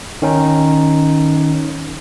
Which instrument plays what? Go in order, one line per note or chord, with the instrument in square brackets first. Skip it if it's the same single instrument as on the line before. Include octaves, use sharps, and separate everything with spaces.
[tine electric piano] D#3 C#4 D#4